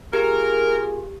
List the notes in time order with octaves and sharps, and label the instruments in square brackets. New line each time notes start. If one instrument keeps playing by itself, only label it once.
[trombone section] A#3 F4 G#4 [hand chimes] G4 [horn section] A#4